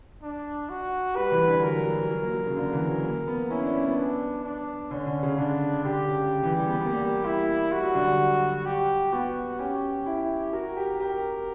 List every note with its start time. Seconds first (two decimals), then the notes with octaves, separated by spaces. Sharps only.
0.23 D4
0.69 F#4
1.16 G3 B4
1.32 E3
1.47 D3
1.63 F#3 A#4
1.87 F#3
2.10 F#3
2.22 A#3
2.34 F#3
2.46 C#3
2.57 D3
2.73 E3
2.88 F#3
3.04 A#3
3.27 B3
3.50 C#4 E4
3.62 D4
3.74 C#4
3.86 B3
3.97 D4
4.44 D4
4.91 D3 C#4
5.06 D3
5.23 C#3
5.38 D3 D4
5.84 D3 G4
6.08 C#3
6.43 E3
6.55 G3
6.67 B3
6.78 B3
6.86 A#3
6.93 G3
7.00 A#3
7.25 E4
7.72 G3 F#4
7.84 F#3
7.95 D3
8.07 G3
8.66 G4
9.12 B3 F#4
9.59 C#4 G4
10.06 E4
10.53 F#4 A#4
10.77 G4
11.00 G4 A#4